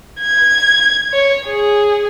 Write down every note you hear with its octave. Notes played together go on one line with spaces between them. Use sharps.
G#6
C#5
G#4